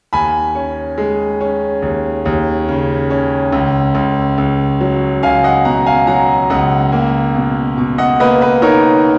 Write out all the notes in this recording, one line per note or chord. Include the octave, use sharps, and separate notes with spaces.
D#2 G#5 B5
C#4
G#3
C#4
D#2
D#2
C#3
C#4
C#2
C#2
C#2
F#3
C#2 F5 G#5
D#5 F#5
B2 F#5 A#5
F5 G#5
F#3 F#5 A#5
C#2 D#5 F#5
A#3
B2
B2
D#5 F#5
A#3 B4 D#5
B4
D#4 A#4 C#5